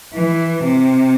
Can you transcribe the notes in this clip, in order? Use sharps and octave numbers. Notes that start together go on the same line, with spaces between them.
E3
C3